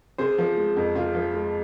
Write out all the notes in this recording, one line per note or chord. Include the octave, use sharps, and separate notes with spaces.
C3 G#4 C5
F3
G#3
F2
C3 F4 G#4
F3
G#3